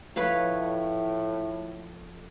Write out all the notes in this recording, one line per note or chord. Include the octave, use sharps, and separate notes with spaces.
A2 F3 A4 B4 C#5 F5